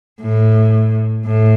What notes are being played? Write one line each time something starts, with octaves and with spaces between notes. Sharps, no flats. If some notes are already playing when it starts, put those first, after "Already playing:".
A2
A2